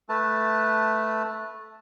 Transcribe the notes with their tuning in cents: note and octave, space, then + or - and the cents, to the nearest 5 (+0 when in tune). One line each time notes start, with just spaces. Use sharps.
A3 -5 B4 -10 A5 +0